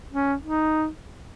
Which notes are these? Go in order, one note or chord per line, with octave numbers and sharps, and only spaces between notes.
C#4
D#4